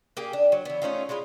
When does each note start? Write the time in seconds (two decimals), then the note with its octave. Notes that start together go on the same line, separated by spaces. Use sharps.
0.17 A#3 G4 G#4
0.33 D4
0.52 F#3
0.65 E3 B3
0.82 A3 C#4 D#4 F4
1.09 G#3 E4 F4 B4